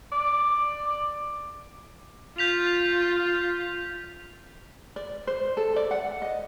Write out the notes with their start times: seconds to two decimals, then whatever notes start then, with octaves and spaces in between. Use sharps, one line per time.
0.12 D5
2.38 F4 G6 B6 F7
4.96 D5
5.27 C5
5.57 A4
5.76 D5
5.91 F#5
6.22 D#5